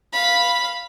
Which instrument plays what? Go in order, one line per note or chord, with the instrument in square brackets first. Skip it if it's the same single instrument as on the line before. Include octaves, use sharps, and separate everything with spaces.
[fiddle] F5 B5